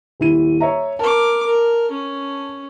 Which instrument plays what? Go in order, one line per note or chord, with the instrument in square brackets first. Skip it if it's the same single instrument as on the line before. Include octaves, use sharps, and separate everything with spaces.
[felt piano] D#1 E4 D#7
C#5 E5 A#5
[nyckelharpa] A#4 D6 [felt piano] A5
[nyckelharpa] A#4
C#4